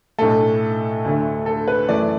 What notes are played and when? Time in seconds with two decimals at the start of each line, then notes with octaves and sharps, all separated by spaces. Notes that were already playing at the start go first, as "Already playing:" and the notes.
0.18 B1 A2 A3 A4
1.05 D2 D3 A3
1.46 A4
1.68 B4
1.89 F#2 E3 A3 D5